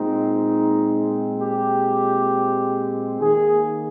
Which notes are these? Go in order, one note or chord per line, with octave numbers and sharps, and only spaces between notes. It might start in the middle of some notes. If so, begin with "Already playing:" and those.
Already playing: A#2 G#3 C4 D#4
G4
D#3 A#3 G#4